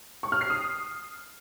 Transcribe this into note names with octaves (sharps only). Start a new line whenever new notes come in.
C#6
F6
C7
D#6